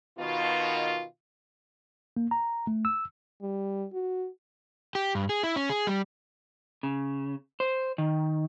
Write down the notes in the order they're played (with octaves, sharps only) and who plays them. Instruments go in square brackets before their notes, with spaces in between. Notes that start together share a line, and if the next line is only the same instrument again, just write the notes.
[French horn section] B2 D#3 F4
[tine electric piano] A#3
A#5
A3
E6
[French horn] G3
F#4
[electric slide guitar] G4
G2
G#4
E4
C#4
G#4
G3
C#3
C5
D#3